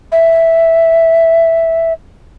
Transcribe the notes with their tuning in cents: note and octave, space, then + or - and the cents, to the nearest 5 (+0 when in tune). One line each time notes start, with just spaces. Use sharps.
E5 +0